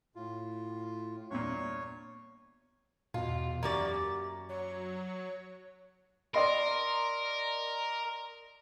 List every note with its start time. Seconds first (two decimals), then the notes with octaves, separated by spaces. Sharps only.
0.16 A2 F4
1.31 E2 G2 A#2 C#5 C#6
3.14 E2 B2 F4
3.63 F#2 A#3 G4 D5 A#5 C#6
4.49 F#3 C#5
6.34 A#4 D5 D#5 C6